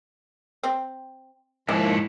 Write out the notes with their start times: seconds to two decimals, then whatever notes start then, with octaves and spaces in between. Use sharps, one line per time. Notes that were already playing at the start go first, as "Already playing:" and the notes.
0.64 C4
1.69 D#2 G#2 E3 F3 E4